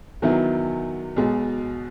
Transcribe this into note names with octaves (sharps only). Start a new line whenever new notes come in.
E2 D#3 F#3 B3 E4
B1 B2 G#3